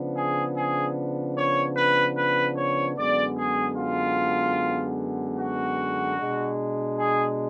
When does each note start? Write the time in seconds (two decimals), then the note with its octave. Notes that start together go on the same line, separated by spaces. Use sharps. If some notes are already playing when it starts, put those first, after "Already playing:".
Already playing: C#3 F3 B3 D4
0.16 G#4
0.56 G#4
1.36 C#5
1.76 B4
2.17 B4
2.57 C#5
2.97 F#2 D3 G#3 B3 D5
3.37 G#4
3.77 F4
5.38 F#4
6.18 B2 G#3 D4
6.98 G#4